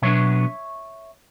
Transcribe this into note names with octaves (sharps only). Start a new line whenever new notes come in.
B2 F#3 B3 D4 C#5 E5